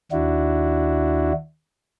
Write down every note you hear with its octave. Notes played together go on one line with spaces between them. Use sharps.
D#2 D4 E4 F#4